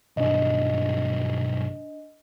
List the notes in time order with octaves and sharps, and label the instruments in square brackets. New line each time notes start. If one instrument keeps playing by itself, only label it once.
[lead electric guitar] B1 G2 [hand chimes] D4 D#5